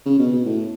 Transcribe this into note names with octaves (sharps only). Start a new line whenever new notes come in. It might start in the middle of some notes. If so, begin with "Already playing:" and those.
C#3
B2
B2
A2